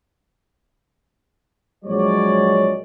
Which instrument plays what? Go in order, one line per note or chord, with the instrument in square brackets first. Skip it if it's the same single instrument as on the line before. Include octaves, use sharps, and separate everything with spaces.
[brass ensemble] A#1 F#3 G#3 C#5 D5